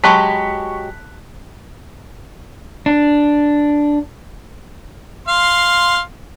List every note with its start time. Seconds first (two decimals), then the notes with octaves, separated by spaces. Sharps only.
0.04 F#3 G#3 G4 A5 B5 C#6 F#6 B6
2.86 D4
5.28 F5 C6